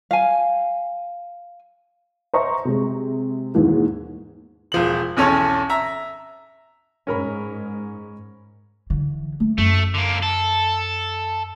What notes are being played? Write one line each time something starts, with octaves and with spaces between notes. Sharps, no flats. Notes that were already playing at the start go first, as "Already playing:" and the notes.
F5 G#5
C5 C#5 D#5 E5 A#5 C#6
C3 G#3
D#2 G#2 B2 E3 A#3
E1 F3 F#7
B1 E2 C#4 A4 C#5
E5 A#5
G#2 C#4 A#4 B5
D3 E3
A3
F#2 A3
D3 A#3
A4